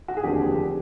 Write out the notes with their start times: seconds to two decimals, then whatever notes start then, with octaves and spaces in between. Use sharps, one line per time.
0.08 F#4
0.17 G#4
0.23 F1 D#2 D3 F3 G4